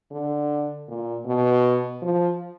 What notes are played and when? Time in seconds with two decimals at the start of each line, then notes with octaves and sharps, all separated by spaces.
0.12 D3
0.88 A#2
1.26 B2
2.02 F3